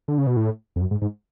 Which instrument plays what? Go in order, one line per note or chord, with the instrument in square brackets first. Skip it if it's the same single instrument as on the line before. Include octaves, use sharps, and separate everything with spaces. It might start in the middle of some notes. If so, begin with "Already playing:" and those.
[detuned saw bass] D3
C#3
B2
A2
F2
F#2
G#2
G#2